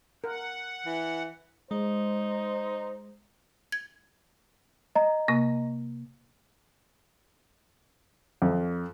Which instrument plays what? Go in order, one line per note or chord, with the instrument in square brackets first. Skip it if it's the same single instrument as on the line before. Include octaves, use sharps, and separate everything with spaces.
[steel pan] A#4 [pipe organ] F#5
[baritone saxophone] E3
[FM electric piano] G#3 [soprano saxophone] D#4 [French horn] C5
[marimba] G#6
[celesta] D#5 A#5
[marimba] C3 A#3
[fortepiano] F2